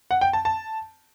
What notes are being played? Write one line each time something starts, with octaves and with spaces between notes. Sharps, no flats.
F#5
G5
A5
A5